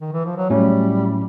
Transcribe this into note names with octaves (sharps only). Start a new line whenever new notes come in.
D#3
E3
F3
F#3
A2 F#3 G3 A3 C#4